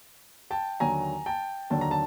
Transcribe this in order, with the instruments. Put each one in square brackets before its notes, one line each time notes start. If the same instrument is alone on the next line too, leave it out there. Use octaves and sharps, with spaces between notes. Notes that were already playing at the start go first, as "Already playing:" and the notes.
[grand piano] G5 A5
D#2 D3 F#3 G#5 A#5
G5 A5
D#2 D3 F#3 A5
A#5
A5